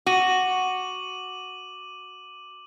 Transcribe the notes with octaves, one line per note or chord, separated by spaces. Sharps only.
F#4 D6 D#7 F#7